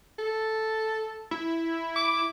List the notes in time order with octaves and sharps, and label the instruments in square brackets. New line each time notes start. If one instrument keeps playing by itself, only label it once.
[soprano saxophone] A4
[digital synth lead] E4
[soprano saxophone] D6